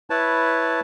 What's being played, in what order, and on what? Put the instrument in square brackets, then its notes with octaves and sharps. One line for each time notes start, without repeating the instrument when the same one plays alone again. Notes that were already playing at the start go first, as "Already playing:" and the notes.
[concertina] E4 B4 C#5 A5